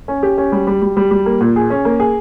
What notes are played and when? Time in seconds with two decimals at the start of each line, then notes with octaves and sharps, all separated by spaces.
0.08 C#4
0.23 G4
0.38 C#4
0.52 G3
0.67 G3
0.82 G3
0.97 G3
1.11 G3
1.26 A#3
1.41 A#2
1.56 G#4
1.70 C#4
1.85 A#3
2.00 G#4